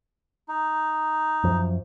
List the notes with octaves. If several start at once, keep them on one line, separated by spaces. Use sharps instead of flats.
D#4
F#2 F3